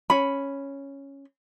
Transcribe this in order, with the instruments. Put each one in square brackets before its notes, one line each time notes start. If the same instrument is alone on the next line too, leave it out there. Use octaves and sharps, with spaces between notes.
[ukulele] C#4 B5